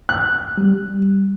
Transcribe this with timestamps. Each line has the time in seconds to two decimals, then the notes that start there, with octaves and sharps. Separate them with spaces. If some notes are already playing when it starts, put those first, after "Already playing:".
0.09 F#6
0.58 G3